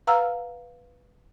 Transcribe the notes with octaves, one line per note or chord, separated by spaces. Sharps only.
B4 F5 F#5 A#5 E6 F6